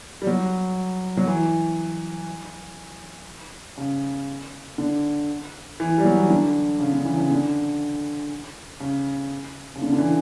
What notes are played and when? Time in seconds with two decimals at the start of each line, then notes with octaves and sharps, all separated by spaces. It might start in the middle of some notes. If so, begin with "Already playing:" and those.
0.22 G3
0.27 F#3
1.17 F#3
1.27 E3
3.78 C#3
4.78 D3
5.80 E3
5.98 G3
6.05 F#3
6.18 E3
6.30 D3
6.80 C#3
6.92 D3
7.05 E3
7.17 C#3
7.31 D3
8.80 C#3
9.76 C#3
9.82 D3
9.93 D3
9.98 E3